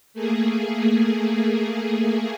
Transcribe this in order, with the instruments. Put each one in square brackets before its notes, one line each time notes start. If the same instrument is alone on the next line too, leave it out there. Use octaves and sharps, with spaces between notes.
[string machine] A3 A#3 G#4